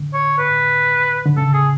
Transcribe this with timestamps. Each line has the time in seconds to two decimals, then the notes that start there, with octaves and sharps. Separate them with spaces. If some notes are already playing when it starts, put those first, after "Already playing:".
Already playing: D3
0.14 C#5
0.38 B4
1.26 D3
1.37 C#3 A4
1.53 G#4